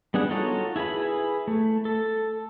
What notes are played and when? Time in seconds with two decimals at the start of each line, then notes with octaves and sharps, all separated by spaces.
0.14 G3 B3 D4 G#4 F#5
0.30 D#4 F4 F#4 A4 C#5
0.76 E4 G#4 B4 B5
1.48 A3
1.85 A4